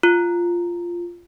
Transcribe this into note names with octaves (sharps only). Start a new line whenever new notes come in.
F4